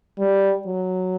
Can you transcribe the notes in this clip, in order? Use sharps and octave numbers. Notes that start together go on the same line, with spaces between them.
G3
F#3